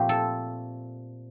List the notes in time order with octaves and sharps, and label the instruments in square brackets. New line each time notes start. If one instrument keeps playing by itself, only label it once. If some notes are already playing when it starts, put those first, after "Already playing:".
Already playing: [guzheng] A#2 F3 A3 C4 G4
A4